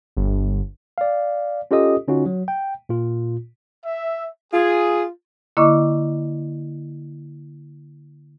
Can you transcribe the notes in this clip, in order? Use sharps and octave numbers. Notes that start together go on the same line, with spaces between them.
G1
D5 F5
C#4 F4 G4 A4 D#5 D#6
D3 C#4 D#4 F4 F#4
F#3
G5
A#2 F4
E5
F4 G#4
D3 A#3 E4 D#5 C#6 D6